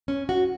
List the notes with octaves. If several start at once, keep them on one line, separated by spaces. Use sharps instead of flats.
C#4
F#4